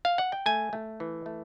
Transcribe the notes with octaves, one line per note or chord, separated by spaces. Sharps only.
F5
F#5
G5
A3 G#5
A3
E3
A3